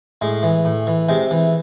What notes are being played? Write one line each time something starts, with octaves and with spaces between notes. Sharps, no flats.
A2 G#3
E3
A2
E3
C3 G#3
E3